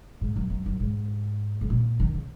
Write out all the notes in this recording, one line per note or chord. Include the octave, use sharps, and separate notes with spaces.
G#2
F#2
F#2
F#2
G#2
G#2
A#2
D#3
C#3